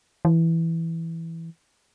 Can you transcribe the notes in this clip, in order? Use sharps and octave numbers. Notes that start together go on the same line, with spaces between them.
E3